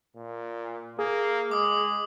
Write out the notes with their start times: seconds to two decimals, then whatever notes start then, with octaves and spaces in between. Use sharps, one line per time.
0.16 A#2
0.99 A#3 G#4
1.51 G#3 D6 D#6